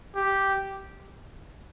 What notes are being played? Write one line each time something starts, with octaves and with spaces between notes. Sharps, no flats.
G4